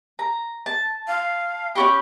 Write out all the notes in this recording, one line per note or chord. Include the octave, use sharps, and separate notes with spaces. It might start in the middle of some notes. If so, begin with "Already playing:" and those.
A#5
A5
F5
C#4 F#4 G4 B5